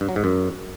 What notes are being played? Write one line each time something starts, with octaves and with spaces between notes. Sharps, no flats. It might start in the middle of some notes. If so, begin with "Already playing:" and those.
G2
F#3
G#2
F#2